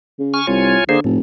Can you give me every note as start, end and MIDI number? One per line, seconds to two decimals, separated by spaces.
0.19 0.40 49
0.34 0.47 80
0.34 0.47 85
0.34 0.47 89
0.47 0.76 36
0.47 0.84 65
0.47 0.84 73
0.47 0.84 80
0.89 0.98 50
0.89 1.00 58
0.89 1.00 68
0.89 1.00 72
1.04 1.20 29
1.04 1.18 45